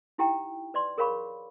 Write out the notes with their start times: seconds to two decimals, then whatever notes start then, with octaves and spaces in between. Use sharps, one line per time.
0.18 D#4 E4 G4 F#5 G5 A#5
0.74 B4 D5 C6
0.98 G#4 A#4 C#5 F5 B5 C#6